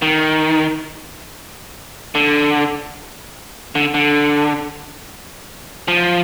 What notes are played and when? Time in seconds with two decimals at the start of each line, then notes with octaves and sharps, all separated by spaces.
0.02 D#3
2.15 D3
3.75 D3
3.94 D3
5.88 F3